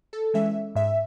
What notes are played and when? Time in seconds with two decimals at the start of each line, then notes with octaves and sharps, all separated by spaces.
0.13 A4
0.34 E3 G#3 C#4 E5
0.75 G#2 E5